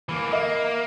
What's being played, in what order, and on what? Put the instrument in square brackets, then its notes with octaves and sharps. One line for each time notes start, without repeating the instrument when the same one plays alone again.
[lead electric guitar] E3 A#3
[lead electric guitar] A#3 [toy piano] A4 D#5 E5